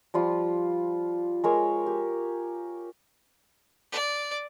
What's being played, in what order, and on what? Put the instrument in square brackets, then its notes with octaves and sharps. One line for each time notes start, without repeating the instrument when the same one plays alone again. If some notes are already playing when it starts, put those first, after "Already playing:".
[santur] F3 G3 F4
G#3 A#4 C#5
G4
[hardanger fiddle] D5